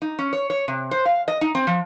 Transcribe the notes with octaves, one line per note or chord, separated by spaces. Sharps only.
D#4
C#4
C#5
C#5
C3
C5
F5
D#5
D#4
C4
F3